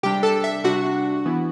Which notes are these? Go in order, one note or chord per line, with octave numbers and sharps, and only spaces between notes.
C3 G3 D4 G4 G5
A4 A5
E5
C3 G3 D4 F#4 F#5
E3 B3 E4